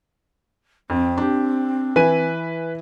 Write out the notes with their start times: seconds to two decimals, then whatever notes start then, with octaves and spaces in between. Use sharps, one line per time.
0.90 F2 C4
1.18 D4 G4
1.96 E3 E4 B4 G#5 D#7